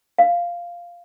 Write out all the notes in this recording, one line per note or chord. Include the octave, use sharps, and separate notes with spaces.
F5